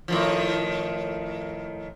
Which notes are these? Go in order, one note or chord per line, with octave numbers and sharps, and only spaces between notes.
A2 D#3 F3